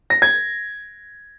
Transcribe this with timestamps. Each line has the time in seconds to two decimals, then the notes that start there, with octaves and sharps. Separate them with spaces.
0.10 A#6
0.22 G#6